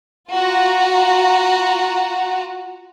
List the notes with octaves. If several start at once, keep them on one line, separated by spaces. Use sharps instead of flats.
F4 F#4 A#5